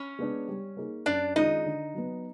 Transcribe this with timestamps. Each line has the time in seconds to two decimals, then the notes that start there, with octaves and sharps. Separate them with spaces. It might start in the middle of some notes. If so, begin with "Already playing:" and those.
Already playing: C#4 C#5
0.19 G#3 B3 D4
0.48 G3
0.77 A#3 D#4 G#4
1.06 F#2 D4 D5
1.36 D#3 G#3 C#4 D#4 F4 D#5
1.66 D3
1.94 F#3 B3